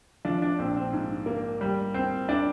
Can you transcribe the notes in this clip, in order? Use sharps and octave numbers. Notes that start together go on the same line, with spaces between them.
F3 D4
D4
A#1 C4
C4
G#2
A#3
G3
C4
D4